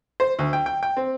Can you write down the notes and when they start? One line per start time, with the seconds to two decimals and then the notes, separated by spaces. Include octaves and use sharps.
0.20 C5
0.39 D2
0.53 G5
0.66 G5
0.83 G5
0.97 C4